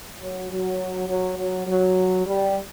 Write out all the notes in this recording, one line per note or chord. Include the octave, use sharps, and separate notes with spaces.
F#3
F#3
F#3
F#3
F#3
G3